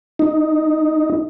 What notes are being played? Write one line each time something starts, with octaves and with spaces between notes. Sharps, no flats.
D#4